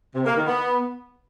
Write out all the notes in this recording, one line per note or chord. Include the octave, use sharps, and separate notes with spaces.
C3
A#3
D#3
B3